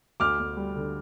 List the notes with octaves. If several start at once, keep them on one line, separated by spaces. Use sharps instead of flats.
D2 D6 F6
D2
G3
D3